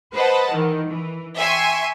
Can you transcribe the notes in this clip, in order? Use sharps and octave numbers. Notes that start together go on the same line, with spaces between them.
B4 C5 D#5 F#5 A5
D#3 E3
E3
E5 G5 G#5 C6 C#6